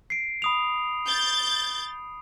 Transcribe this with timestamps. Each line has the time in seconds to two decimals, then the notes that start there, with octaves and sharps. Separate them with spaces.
0.10 C7 D7
0.42 B5 D#6 F7
1.07 G6 A6